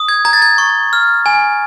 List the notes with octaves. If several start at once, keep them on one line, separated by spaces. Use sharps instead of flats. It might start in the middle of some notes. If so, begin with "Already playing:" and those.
Already playing: D#6
G#6
A#5 G#6
A6
G#6
C#6
F6
G#5